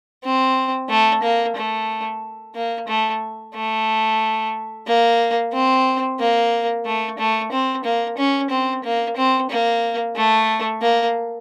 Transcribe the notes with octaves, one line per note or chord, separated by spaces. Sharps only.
C4
A3
A#3
A3
A#3
A3
A3
A#3
C4
A#3
A3
A3
C4
A#3
C#4
C4
A#3
C4
A#3
A3
A#3